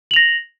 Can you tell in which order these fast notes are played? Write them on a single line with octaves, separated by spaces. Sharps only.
F#7 F7 A#6